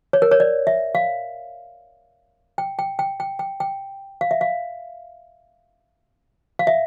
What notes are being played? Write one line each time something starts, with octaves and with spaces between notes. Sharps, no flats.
C#5
A#4
C#5
D5
E5
F5
G5
G5
G5
G5
G5
G5
F5
E5
F5
F5
E5